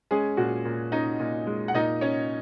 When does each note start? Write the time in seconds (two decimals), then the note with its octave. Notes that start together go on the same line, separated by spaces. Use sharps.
0.11 G#3 C#4 G#4
0.37 A#2 F#4
0.65 A#2
0.92 C#4 D#4 D#5
1.19 A#2
1.47 G#3
1.68 F#5
1.74 A#2 D#4 D#5
2.01 C#4 C#5